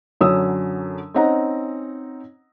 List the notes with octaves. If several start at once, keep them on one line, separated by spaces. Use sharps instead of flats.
F#2 D3 F#3 C#4 D#6 E6
C4 C#4 D#4 D#5 F#5 A#5